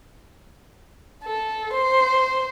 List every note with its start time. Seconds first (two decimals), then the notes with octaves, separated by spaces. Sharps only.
1.24 A4
1.73 C5